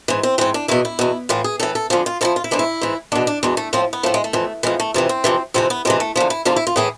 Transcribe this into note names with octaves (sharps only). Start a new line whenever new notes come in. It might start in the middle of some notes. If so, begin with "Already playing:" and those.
G#2 E3
C4
G#2 E3 C4
D4
E2 B2 E4
E4
E2 B2
A2 E3 F4
G#4
A2 E3 A4
A4
F2 D3 F3 G#4
F4
F2 D3 F3 E4
F4
E4
G#2 E3 D4
E4
G#2 E3
E2 B2 D4
D4
E2 B2 G#3
A3
A2 F3 C4
B3
A2 F3 A3
G#3
A3
F2 E3
F2 E3 G#3
A3
F2 C3 E3
C4
F2 C3 E3
F2 C3 E3 C4
B3
F2 C3 E3 G#3
A3
E2 D3 F3
E4
E2 D3 F3 F4
E4
F4
A2 E3 G#4